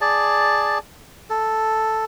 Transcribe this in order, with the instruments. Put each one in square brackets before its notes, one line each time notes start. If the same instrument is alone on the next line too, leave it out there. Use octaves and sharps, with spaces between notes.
[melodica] G#4 D5 A5
A4